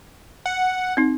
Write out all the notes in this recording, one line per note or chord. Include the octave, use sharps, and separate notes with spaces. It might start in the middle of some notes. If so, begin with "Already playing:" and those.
F#5
C4 D#4